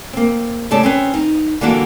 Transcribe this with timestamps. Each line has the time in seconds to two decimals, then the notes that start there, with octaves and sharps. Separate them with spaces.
0.13 A#3 C4
0.71 A2 C#3 G3 A3 D5 A5
0.83 C4 C#4 B4
1.14 D#4
1.61 D3 E3 G3 A#3 D4 F#4